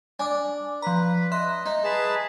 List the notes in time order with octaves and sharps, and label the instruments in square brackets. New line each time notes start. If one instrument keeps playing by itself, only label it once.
[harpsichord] D4 [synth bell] G#5 D6
[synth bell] F3 A#5 [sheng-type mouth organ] B4
[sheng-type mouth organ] D#5 [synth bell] E5 C6 F#6
[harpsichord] D#4
[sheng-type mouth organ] G#4 B4 A5